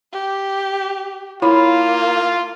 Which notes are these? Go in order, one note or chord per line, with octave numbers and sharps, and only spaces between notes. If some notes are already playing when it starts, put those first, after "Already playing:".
G4
A#3 E4 F4 C#5 B5